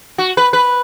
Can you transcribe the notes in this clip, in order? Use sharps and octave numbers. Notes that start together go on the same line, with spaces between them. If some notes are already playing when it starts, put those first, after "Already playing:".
F#4
B4
B4